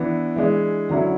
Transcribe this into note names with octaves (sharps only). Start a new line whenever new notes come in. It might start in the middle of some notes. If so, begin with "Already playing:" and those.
Already playing: E3 B3 D4
E3 G#3 D4
D3 F#3 C#4 E4